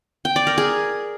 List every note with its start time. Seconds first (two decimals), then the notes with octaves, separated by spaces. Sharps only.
0.25 G5
0.36 D5
0.47 A#4
0.58 G#4